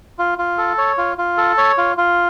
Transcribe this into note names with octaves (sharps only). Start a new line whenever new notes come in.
F4
F4
A4
C#5
F4
F4
A4
C#5
F4
F4